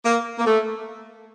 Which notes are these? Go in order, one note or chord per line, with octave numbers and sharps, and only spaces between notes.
A#3
A#3
A3